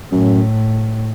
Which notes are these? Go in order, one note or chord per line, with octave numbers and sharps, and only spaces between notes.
F#2 A2